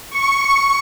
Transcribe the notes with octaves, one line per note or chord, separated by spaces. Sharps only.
C#6